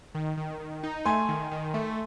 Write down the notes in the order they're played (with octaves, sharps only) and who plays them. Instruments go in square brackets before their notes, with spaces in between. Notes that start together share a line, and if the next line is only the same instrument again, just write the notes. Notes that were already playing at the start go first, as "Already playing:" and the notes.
[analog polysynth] D#3
D#3
D#3
D#4
[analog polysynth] A3 [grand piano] G#5 C6
[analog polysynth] D#3
D#3
A3